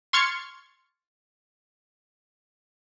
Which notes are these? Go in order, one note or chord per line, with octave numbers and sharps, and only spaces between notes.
C6 C#6 F6 G#6 A6 C#7